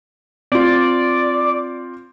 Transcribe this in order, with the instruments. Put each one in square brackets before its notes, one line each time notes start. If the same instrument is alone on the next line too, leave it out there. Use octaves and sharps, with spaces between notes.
[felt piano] C4 F4 [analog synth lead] D5